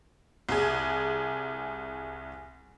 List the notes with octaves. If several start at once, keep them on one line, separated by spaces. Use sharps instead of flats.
C2 G#4